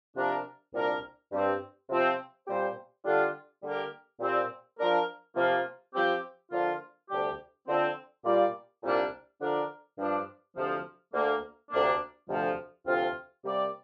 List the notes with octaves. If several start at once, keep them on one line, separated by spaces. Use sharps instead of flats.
C3 F3 D4 A#4
C2 A#2 G3 D4 A#4
G2 G3 C4
C3 F3 C4
A#2 G3 C4 G4 C5
D3 G3 D4 F4
D3 G3 A#3 G4 A#4
A#2 G3 C4
F3 D4 A#4
C3 F3 A#3 F4
F3 C4 G4
D3 F3 A#3 D4 F4
D2 C3 G3 D4 G4
D3 F3 C4
A#2 G3 A#3 F4 D5
C2 A#2 G3 A#3 D4
D3 F3 D4 A#4 D5
G2 F3 D4
D2 C3 F3
D2 D3 A#3
D2 C3 A#3 D4
D2 C3 F3
D2 C3 F3 C4 F4
C3 G3 A#3 G4 D5